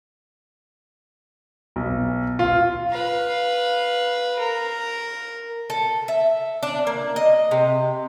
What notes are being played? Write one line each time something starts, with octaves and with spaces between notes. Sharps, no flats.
B1
F4
B4 F5
A#4
A4
E5
D4
A#3
D#5
C3